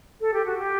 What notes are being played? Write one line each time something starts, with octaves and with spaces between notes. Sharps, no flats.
A4
G4
F#4
G4